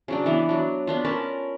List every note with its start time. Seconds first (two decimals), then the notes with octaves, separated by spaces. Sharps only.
0.08 C#3 F#3 D4
0.26 E3 B3
0.49 F#3 D4
0.87 B3 D4 F4
1.04 C#4 A#4 A5 B5